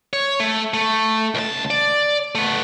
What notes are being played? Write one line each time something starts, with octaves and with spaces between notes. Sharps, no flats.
C#5
A3
A3
C#2 A5
D5
A3 B3